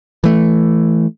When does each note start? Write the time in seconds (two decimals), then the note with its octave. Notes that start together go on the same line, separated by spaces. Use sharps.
0.24 E3 A3